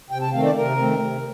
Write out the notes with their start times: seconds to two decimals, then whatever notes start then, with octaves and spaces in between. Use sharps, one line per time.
0.10 C3 G5
0.21 A5
0.33 D#3 A3 C4 F5
0.43 D5
0.55 C3 A#4
0.77 D#3 A3 C4
0.99 C3